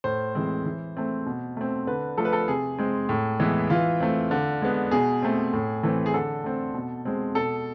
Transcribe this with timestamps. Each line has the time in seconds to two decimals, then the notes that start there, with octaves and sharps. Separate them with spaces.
0.04 A2 C5
0.35 E3 G#3 C4
0.66 E3
0.97 A3 C4
1.26 B2
1.57 A3 C4
1.87 D3 B4
2.18 F3 A3 A4
2.25 B4
2.33 A4
2.48 C3 G#4
2.78 G#3 C4
3.09 A2
3.40 E3 G#3 B3
3.70 E3 F4
4.00 A3 C4
4.31 D3
4.62 G#3 B3
4.91 B2 G#4
5.23 A3 C4
5.53 A2
5.83 E3 A3 C4
6.06 G#4
6.14 D3 A4
6.44 A3 C4
6.74 B2
7.05 G#3 C4
7.35 B2 A4